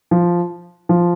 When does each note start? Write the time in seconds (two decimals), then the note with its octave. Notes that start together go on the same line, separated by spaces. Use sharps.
0.11 F3
0.89 F3